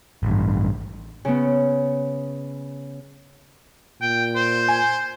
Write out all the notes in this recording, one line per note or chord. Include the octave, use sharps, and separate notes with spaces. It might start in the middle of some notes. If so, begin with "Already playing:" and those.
A1 G2
C#3 B3
A#2 G5
C5
G#5